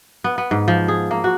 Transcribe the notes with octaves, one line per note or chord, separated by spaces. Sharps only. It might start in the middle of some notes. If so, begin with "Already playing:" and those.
B3
B3
G#2
F3
G#4
A#3
F#4